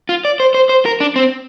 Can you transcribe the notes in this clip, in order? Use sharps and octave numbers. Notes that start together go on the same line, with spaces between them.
F4
D5
C5
C5
C5
A#4
D4
C4